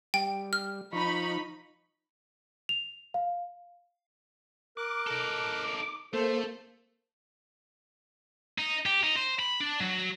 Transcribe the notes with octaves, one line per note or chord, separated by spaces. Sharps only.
G3 G5
F6
F3 D#4 B5 C#6
F7
F5
A#4 D6 F#6
D#4 A4
A3 A#3 A4 C5
D#4
G4
D#4
C5
B5
D4
F#3